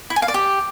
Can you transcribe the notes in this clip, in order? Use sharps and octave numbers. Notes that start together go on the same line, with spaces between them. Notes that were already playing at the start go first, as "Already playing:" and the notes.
E4
G#5
F5
D5
G4